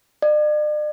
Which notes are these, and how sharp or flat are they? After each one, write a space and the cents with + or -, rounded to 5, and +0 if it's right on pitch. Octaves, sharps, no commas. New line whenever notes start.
D5 +45